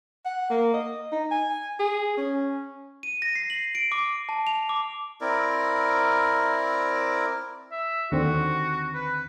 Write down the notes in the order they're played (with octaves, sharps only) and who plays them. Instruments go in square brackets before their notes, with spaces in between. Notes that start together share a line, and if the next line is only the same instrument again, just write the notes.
[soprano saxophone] F#5
A#3
D#5
D#4
G#5
G#4
C#4
[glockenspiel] D#7
A#6
C7
F#7
D7
D6
A5
F7
D6
[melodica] C4 E4 A#4 D5
[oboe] E5
[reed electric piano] D#2 D3 C4 [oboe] F#4
[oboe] B4